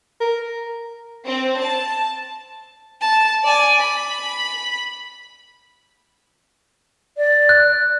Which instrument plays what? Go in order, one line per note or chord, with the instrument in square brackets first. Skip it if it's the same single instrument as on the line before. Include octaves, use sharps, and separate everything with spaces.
[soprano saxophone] A#4
[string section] C4
A5
[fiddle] A5
D5 G#5
B5
[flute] D5
[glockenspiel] F#6